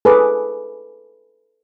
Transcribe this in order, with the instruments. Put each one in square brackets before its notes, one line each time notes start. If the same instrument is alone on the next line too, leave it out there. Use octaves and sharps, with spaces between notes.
[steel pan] G#4 A4 B4 B5 D6